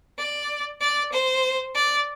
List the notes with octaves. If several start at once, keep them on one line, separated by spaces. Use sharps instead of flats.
D5
D5
C5
D5